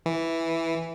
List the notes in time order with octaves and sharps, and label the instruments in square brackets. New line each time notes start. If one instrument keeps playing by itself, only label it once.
[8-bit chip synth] E3